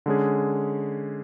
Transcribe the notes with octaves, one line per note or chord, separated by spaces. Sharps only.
D3 G#3 C#4 G#4